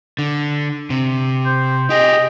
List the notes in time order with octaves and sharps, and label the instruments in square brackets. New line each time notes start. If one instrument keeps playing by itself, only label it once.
[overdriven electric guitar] D3
C3
[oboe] C5
[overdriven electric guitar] G4 G#4 [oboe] D#5